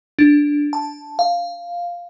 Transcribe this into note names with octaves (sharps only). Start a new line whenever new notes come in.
D4
A5
F5